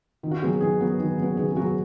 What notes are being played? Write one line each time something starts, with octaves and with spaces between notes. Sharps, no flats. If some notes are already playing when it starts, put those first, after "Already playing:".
D#3
F#4
F#3 B3 G#4
D#3 G#4
F#3 B3
D#3
F#3 B3
D#3 G#4
G#4
F#3 B3 F#4